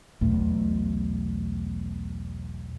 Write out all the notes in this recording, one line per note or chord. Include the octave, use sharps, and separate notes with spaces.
B1 E2 A3